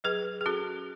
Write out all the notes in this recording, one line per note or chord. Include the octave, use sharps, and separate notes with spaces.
F#3 G#4 B4
G#4
C#4 F#4 A4